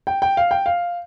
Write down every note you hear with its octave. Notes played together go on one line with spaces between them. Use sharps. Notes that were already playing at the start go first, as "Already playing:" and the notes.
G5
G5
F5
G5
F5